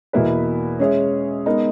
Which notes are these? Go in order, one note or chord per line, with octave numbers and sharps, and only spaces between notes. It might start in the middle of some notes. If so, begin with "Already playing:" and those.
E2 B2 A#3 E4 B4
G#3 C#4 G#4 C#5 E5
G#3 B3 D#4 A#4